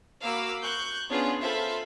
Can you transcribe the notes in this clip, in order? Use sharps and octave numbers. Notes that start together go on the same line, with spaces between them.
A#3 F#4 F5 B5 D6 E6
C#6 F#6 G6
B3 C#4 D4 F4 G#4
F4 A4 C5 E5 F5 B5